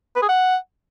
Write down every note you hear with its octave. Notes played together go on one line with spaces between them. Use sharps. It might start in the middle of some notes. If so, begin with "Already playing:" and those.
B4
G#4
F#5